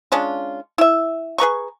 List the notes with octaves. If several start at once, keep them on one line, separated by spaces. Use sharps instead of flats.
G#3 C#4 D4 F4
E4 E5
G#4 B4 A#5 C#6